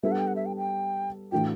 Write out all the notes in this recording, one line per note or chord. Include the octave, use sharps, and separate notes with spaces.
G3 B3 D4 A4 E5
F#5
G5
F#5
E5
G5
G5
A2 E3 A3 D4 F#4 G5